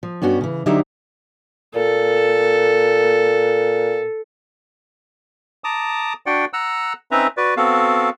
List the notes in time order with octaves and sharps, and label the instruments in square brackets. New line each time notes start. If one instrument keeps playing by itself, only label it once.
[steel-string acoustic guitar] F3
G2 B3 C#4 F#4
C#3 E3
D3 F#3 D#4 G4 C5 E5
[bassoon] A#2 [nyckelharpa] A4
[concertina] A5 A#5 D6 D#6
D4 F#4 D5 F#5 G5
F#5 A#5 E6 F#6
C4 C#4 D#4 B4 E5 A#5
F#4 B4 D5
B3 C4 F#4 A4 F5